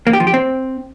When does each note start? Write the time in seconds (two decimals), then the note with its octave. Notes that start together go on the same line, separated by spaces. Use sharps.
0.07 A#3
0.13 G4
0.20 F3
0.27 G4
0.34 C4